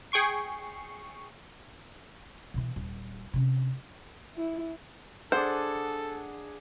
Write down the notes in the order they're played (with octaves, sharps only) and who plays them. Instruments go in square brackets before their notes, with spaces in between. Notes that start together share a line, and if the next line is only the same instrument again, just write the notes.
[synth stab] G#4 G5 C#6 C7
[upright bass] B2 E3
D#1
C3 C#4
[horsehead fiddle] E4
[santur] D4 G#4 F#5 [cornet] A4 [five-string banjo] C5